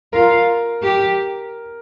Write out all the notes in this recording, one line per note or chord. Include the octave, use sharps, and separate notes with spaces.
F4 A#4
G4